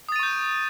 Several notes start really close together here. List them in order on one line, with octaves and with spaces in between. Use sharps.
D#6 A6 D#7 C#6 G6